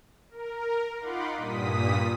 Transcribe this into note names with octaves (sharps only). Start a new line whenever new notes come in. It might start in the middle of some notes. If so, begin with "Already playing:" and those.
A#4
D#4 F4 F#5 B5 C6 D6
G2 A#2 D#6 B6